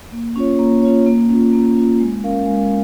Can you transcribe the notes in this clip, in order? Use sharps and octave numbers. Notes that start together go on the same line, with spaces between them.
A#3
C#4 F4 C#5
A#3
C#4 F4 C#5
A#3
C#4 F4
A#3
C#4 F4
G#3
C#4 A#4 F5
G#3